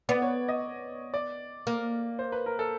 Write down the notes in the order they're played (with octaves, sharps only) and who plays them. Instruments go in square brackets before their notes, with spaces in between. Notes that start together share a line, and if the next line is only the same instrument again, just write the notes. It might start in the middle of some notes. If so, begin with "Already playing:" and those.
[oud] B3 [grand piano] D5
[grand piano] C#5
D#5
D5
[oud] A#3
[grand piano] C5
B4
A#4
A4